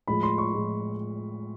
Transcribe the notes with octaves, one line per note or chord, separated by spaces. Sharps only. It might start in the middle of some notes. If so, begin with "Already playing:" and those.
A2 F3 G#3 B5
C6
C#6
A2 F3 G#3